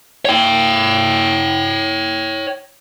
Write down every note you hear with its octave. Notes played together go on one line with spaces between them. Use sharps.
C#5 G5